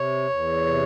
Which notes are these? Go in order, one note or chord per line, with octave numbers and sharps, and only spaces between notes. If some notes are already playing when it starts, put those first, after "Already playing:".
Already playing: C3 C#5
E2
C3